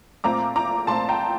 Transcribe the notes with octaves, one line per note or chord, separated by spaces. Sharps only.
A#2 A3 C4 A#5 D6
A#5 D6
A#2 A3 C4 A5 C6
G5 A#5